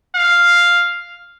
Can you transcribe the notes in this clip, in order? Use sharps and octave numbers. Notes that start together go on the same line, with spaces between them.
F5